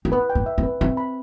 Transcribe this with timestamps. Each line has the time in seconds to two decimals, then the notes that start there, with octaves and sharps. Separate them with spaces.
0.05 C4
0.12 B3 B4
0.30 G5
0.35 B3
0.46 E5
0.58 C4
0.63 B4
0.81 C4 E5
0.97 B5